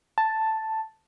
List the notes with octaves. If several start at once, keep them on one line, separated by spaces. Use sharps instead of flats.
A5